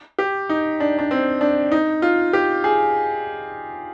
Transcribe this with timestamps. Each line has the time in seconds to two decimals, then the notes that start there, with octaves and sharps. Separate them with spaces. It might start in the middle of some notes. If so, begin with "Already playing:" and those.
0.19 G4
0.49 D#4
0.80 D4
0.99 D4
1.11 C4
1.41 D4
1.72 D#4
2.02 F4
2.33 G4
2.64 G#4